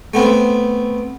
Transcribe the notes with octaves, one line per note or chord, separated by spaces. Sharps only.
A3 B3 C4